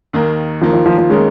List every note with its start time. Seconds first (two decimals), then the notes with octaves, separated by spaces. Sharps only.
0.13 D#2 D#3 A#3
0.61 D#2 D#3 F3 A#3
0.73 F3
0.86 F3
0.98 F3
1.09 D#3 G#3 A#3 C#4